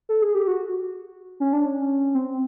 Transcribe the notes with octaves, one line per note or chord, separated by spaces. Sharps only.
A4
G#4
G4
F#4
C#4
D4
C#4
C4